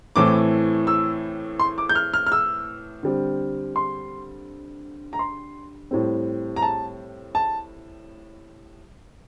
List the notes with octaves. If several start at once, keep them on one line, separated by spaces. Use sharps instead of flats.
A2 E3 A3 C4 D6
E6
C6
D6
G6
F6
F6
F6
E6
D3 G3 C4
C6
A#5
C6
A2 G3 C4
A#5
A5
A5